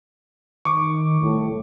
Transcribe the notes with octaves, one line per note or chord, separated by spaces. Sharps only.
D#3 C#6 D6
C2 A2